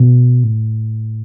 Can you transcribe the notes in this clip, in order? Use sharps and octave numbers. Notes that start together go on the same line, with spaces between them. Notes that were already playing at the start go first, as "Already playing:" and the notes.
Already playing: B2
A2